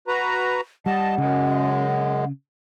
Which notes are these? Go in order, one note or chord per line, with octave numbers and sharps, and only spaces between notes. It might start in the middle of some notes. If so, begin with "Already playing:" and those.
F#4 B4 A#5
G3 D#5 F#5 A5
F#2 C#3 G#3